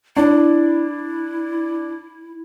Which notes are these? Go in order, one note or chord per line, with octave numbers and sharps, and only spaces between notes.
D4 E4